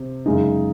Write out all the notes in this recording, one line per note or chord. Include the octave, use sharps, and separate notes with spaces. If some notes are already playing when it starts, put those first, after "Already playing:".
Already playing: C3 C4
F#2 C#3 G#3 D#4 G#4